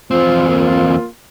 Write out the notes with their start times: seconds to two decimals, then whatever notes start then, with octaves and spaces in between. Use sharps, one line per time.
0.11 E2 F3 C4 F4
0.48 A#3 F4